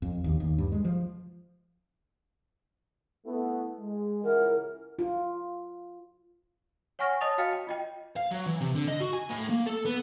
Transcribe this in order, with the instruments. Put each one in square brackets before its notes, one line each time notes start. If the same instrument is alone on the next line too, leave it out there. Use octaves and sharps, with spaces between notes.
[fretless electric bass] F2
D#2
D#2
G2
G#3
F3
[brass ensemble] A3 B3 E4
G#3
[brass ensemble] C#2 E3 F#5 [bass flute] A#4
[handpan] F4
[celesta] C#5 F#5 G#5 C#6 F6 A#6
C#5 D#5 A5 D#6 A6 F7
F#4 F5 G5 F6 A6 C#7
G5
F4 D#5 G5
[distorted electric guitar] F5
F#3
E3
C3
D3
D#5
F#4
G#5
A2
A#3
A4
B3